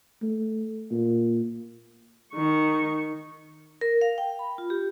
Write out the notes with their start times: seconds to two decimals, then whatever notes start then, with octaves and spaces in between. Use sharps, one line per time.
0.22 A3
0.91 A#2
2.34 D#3 C#6
3.81 A#4
4.01 F5
4.18 G5
4.39 B5
4.58 F4
4.70 G4